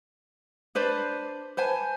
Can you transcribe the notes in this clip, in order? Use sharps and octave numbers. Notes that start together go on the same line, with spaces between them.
D4 B4 C5 D5
B4 C5 G#5 A5